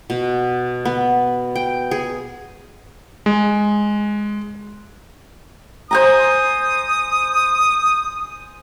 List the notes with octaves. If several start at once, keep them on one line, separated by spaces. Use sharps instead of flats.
B2
B3
G5
G#4
G#3
C5 G#5 A#5 D#6